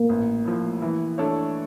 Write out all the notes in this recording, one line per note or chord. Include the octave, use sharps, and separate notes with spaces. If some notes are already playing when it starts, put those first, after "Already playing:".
Already playing: A#3
A1
A2 F3
E3
A3 D4 A4 C#5